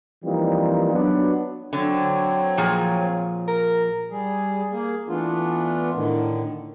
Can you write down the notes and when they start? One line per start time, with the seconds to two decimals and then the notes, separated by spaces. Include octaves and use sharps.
0.25 E3 F3 G3 A#3 C4 D#4
0.93 F#3 B3 D4
1.73 D3 F#3 C4 C#5
2.57 A#2 F3 G#4
3.48 A#4
4.11 G3 G#4
4.71 A#3 G#4
5.08 E3 A3 B3 D4 F4
5.94 A2 D3 D#3